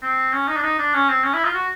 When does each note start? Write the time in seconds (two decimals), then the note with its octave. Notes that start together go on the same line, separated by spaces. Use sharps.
0.03 C4
0.33 C#4
0.48 D#4
0.57 D4
0.63 D#4
0.79 D4
0.94 C#4
1.09 C4
1.24 C#4
1.34 E4
1.44 F4
1.54 F#4